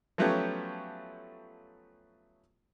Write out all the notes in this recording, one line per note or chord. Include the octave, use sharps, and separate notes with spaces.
F3 F#3 A3 B3 C#4 G4